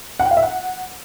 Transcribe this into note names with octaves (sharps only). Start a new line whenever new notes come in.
F#5
G5
F5
E5
F#5